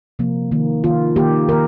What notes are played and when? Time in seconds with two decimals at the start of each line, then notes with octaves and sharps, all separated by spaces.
0.19 C3 F3 A#3
0.52 D#3 A#3
0.84 D#3 A#3 F4
1.16 D#3 A#3 G4
1.49 D#3 A#3 A#4